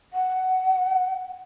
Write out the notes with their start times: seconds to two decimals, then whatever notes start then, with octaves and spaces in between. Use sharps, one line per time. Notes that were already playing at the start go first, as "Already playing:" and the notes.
0.13 F#5